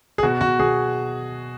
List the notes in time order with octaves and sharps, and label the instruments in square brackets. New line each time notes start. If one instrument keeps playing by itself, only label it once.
[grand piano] G#4
B2 F#4
B2 F#4
B2 G#4